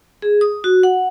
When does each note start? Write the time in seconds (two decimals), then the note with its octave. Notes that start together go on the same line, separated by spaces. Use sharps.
0.22 G#4
0.41 D#6
0.64 F#4
0.83 F#5